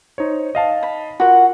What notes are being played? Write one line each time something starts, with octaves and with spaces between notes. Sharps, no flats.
D#4 C5 C#5
D#5 F5 A5
B5
F4 F#4 A#4 F#5